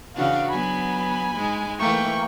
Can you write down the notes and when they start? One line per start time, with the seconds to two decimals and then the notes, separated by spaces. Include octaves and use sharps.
0.16 C#3 E3 D4 F#4 F5
0.51 F#3 B3 G#5 B5
1.35 G#2 G#3
1.80 E3 A3 A#3 G5 C#6